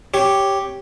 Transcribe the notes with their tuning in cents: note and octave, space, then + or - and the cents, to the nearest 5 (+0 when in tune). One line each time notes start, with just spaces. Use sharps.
G4 +0 C#5 +0